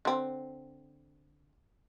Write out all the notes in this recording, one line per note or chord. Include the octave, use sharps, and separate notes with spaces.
D3 C4